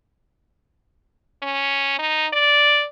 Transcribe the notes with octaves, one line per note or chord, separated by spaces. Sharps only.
C#4
D#4
D5